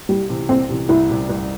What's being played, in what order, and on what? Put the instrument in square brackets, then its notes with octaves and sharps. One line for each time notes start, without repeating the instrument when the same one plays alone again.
[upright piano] C2 [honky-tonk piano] G3
[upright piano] C3 E3
[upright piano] C2 [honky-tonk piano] C4
[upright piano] C3 E3
[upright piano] C2 [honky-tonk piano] E4
[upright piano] C3 G3
C2